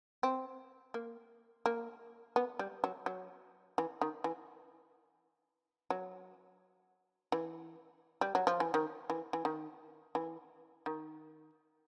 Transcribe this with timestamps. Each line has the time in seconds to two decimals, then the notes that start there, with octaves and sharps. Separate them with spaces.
0.23 C4
0.94 A#3
1.66 A#3
2.36 B3
2.59 G3
2.84 F#3
3.06 F#3
3.78 E3
4.02 D#3
4.24 E3
5.90 F#3
7.32 E3
8.21 G3
8.35 F#3
8.47 F3
8.60 E3
8.74 D#3
9.10 E3
9.33 E3
9.45 D#3
10.15 E3
10.86 D#3